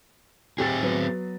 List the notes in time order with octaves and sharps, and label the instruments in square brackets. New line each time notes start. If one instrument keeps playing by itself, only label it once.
[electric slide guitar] C4 G#4 [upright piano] G4 A6
[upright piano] F#3 B3